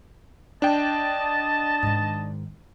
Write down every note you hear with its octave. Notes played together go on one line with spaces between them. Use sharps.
D4 D#5 G5 A5
G#2 D#3